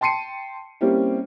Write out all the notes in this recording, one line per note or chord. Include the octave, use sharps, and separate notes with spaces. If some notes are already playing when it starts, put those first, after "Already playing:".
G5 A5 C6 C7 C#7 D#7
G3 A#3 C4 C#4 E4 G4